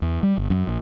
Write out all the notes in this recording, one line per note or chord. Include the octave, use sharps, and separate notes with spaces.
E2
G3
G1
F#2
A#1